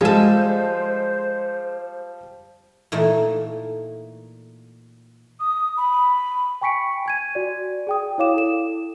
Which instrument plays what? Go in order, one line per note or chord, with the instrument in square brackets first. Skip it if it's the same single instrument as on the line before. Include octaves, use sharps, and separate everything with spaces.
[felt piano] F3 G3 [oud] G#3 A4 [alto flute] C5
[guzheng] A#2 E3 A3 D#4
[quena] D#6
B5
[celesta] G5 G#5 C#6 B6 C#7 D7
G#5 G#6 D#7
F#4 D5
G#4 G5 D#6
E4 C#5 F5 D6 E7
E4 A4 E7